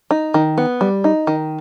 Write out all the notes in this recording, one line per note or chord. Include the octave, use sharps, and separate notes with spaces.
D#4
D#3
B3
G3
D#4
D#3